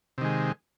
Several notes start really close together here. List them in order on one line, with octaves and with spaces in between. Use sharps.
C3 D#3 G#3